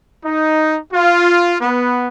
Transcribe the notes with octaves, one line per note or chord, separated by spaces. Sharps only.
D#4
F4
B3